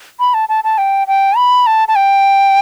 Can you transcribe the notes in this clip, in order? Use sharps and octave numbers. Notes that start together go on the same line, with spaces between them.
B5
A5
A5
A5
G5
G5
B5
A5
A5
G5